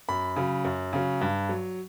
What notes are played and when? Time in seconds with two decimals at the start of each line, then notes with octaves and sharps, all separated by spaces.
0.09 F#2 B5
0.36 C#3 F#3
0.65 F#2
0.93 C#3 F#3
1.21 G2
1.49 F#3